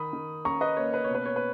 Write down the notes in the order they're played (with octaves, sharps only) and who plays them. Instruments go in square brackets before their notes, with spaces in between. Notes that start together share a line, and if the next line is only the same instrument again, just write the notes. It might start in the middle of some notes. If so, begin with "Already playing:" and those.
Already playing: [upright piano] D#3 B5 D#6
D#3
C#4 A#5 C#6
B4 D#5
A#3 C#5
B4
C#5
B2
B4
C#5
B4